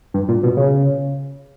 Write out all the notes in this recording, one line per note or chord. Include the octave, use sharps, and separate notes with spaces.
G2
A#2
B2
C#3